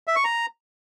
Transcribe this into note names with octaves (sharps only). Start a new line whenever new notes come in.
E5
C#6
A#5